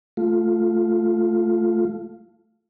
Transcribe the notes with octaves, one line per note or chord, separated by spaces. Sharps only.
A3 F4